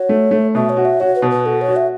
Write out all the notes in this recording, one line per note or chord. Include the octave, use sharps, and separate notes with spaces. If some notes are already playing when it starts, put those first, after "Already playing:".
Already playing: F#4 C#5
A3
A3
B2 E5
C#5
F#4
E5
F#4 C#5
B4
B2
B4
F#4 A4
C#5
F#4
E5